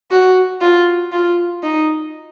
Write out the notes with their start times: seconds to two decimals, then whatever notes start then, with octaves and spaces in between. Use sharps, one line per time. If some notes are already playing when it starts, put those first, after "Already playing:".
0.11 F#4
0.61 F4
1.12 F4
1.63 D#4